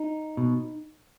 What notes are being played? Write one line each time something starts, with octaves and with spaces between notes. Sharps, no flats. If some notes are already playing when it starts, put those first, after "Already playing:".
Already playing: D#4
B2